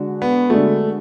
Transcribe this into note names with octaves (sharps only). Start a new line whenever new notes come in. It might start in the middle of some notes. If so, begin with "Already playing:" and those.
Already playing: D3 G#3 D4 F#4
B3
D3 G#3 A3 D4 F#4